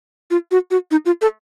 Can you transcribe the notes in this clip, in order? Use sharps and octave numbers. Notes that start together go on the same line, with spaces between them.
F4
F#4
F#4
D#4
F4
A4